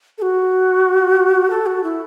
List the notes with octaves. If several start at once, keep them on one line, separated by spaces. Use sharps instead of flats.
A4
F#4
A4
F#4
E4